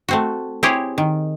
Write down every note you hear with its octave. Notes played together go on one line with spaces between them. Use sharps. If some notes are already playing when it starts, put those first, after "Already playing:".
A3 C4 F#4
C4 E4 G4 G#4 C#5
D#3